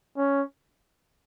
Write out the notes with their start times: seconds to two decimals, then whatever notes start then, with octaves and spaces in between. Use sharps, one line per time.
0.17 C#4